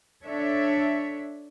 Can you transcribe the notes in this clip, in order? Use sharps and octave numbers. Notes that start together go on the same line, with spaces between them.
D4 A4 C#5 E5